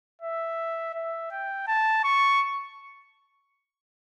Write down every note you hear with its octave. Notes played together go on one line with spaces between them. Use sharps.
E5
E5
G5
A5
C#6